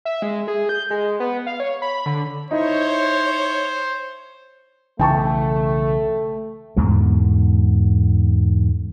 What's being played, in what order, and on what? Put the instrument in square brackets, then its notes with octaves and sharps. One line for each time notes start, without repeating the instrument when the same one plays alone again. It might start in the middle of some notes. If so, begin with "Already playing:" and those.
[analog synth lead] E5
G#3
G#4
G6
G#3
B3
F5
C#5
B5
D3
[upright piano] D#4 E4 [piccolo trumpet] C5 [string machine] C#5
[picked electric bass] B1 C#3 E3 [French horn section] A3 [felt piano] G5 A5 C#6
[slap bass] E2 G#2 B2 D3